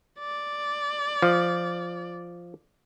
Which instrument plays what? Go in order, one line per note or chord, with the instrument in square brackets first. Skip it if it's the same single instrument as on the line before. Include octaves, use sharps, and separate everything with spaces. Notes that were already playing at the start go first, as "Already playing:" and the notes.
[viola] D5
[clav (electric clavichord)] F3